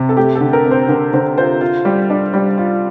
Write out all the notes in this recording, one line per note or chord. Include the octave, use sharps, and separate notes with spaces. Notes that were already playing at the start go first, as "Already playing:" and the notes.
Already playing: C3
A4
A3 G4
A4
D3
A#4
C4
C5
D3 A#4
D3 C5
F4 C5
F4
G3
D4
G3
F4